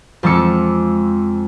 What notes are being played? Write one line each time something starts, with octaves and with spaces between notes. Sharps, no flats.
F2 F3 G#3 D6 E6 C#7